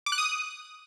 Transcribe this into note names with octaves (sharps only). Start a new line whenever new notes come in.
D6
F#6
D#6